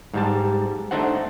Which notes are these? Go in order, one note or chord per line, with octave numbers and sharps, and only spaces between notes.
G#2 G3 A5
A3 D4 D#4 C5 F#5